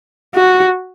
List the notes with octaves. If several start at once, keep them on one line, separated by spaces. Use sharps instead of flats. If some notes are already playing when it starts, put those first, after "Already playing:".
F#4